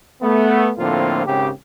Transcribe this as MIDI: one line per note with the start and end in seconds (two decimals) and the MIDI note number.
0.22 0.71 57
0.22 0.71 59
0.79 1.25 45
0.79 1.25 50
0.79 1.25 53
0.79 1.25 58
0.79 1.25 60
0.79 1.25 65
1.26 1.50 32
1.26 1.50 49
1.26 1.50 67